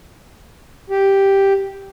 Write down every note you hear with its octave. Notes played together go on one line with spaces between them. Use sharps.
G4